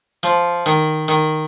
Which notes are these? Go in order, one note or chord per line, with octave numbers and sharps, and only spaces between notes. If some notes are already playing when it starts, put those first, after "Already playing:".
F3
D#3
D#3